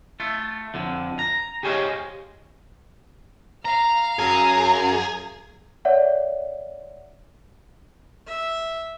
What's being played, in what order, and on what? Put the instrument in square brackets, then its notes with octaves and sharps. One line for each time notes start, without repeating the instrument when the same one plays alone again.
[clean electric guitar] A3 F4
F2 D3
A#5
G4 G#4 C5 C#5 D#5 F5
[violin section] F5 [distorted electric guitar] A#5
[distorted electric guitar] F#2 [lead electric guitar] G#4 [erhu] A#5
[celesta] C#5 D5 E5 F#5
[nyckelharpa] E5